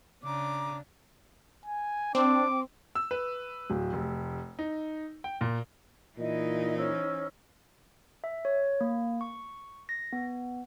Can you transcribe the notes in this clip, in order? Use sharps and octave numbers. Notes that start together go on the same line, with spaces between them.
C#3 D4 A#5 D6
G#5
C4 D4 D6
E6
B4
D1
F1
D#4
G5
A#2
A#2 E3 D#4 E4 D#5
C#4 C5 E6
E5
C#5
A#3
C#6
A#6
B3